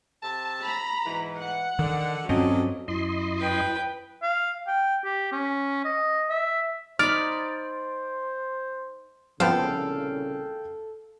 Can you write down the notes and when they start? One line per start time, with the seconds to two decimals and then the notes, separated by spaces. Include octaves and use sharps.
0.23 C3 E5 A5
0.63 A#5 B5
1.06 G#2 B2 E3
1.39 F#5
1.79 D3 D#3
2.29 G2 F3 F#3 C4 C#4 A4 D5 D#5
2.88 F#2 E4 D#5 C6
3.39 B4 G5
4.22 F5
4.67 G5
5.04 G4
5.32 C#4
5.85 D#5
6.30 E5
6.99 D#4 C5 D5 B5 F6
9.40 C2 A#2 C#3 F3 B3 A4 F5 G5